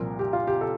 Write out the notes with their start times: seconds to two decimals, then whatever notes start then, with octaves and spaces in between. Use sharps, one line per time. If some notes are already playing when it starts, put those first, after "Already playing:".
Already playing: C2 A#2 F3 A#4
0.19 G4
0.33 F4
0.47 G4
0.61 A4